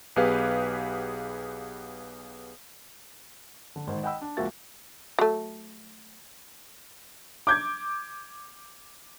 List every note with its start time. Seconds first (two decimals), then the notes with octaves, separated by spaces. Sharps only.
0.16 B1 B3 G4 G#4 B4 F5
3.76 D3
3.87 G#1 D#3 C5
4.03 D#5 F#5 G5 B5 E6
4.22 D4
4.37 C#2 F3 A#3 F#4 E5 A6
5.19 F#3 A3
7.47 D6 G6 G#6